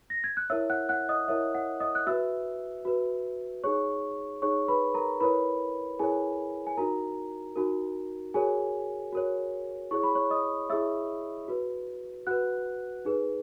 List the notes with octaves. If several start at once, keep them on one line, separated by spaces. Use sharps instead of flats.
A#6
G#6
F#6
E4 A#4 C#5 E5 E6
F#5 F#6
F#5 F#6
D#5 D#6
E4 A#4 C#5 E5
F#5
D#5 D#6
F#6
F#4 B4 E5 E6
F#4 B4
D#4 G#4 C#5 C#6
D#4 G#4 C#5 C#6
B4 B5
A#4 A#5
E4 A#4 B4 C#5 B5
E4 G#4 A#4 C#5 G#5
G#5
D#4 F#4 A#4 A#5
D#4 F#4 A#4
F#4 G#4 A#4 C#5 G#5
F#4 A#4 C#5
E4 G#4 C#5 C#6
B5
C#5 C#6
D#5 D#6
E4 G#4 C#5 E5 E6
F#4 B4
F#4 B4 F#5 F#6
D#4 G#4 B4